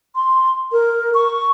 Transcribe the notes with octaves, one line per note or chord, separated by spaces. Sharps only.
C6
A#4
C#6